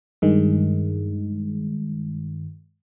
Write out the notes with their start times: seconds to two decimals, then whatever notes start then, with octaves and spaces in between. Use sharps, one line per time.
0.22 G2 D#3 G#3